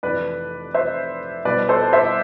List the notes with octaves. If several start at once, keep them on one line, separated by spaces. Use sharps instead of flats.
F1 F2 E3 B4 D5
C5 E5
C2 B2 B4 D5
A4 C5
C5 E5